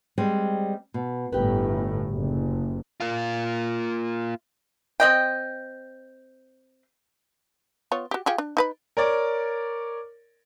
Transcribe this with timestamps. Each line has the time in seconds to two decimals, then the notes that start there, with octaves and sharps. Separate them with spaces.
0.18 G3 G#3 C4
0.94 B2
1.32 G1 A2 G4 B4
2.09 F#1
3.00 A#3 F4
5.00 C4 D#5 G5
7.92 B3 F4 C#5
8.11 F#4 G4
8.26 F4 G4 G#4
8.38 D4
8.57 D#4 B4 B5
8.97 A#4 C#5 D5